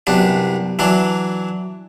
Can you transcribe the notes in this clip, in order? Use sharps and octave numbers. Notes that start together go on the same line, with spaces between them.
C2 F#2 B3 D4
E3 F#3 D4